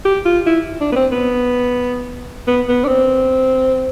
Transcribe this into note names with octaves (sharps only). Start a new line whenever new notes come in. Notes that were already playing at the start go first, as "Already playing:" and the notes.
G4
F4
E4
D4
B3
C4
B3
B3
B3
D4
C4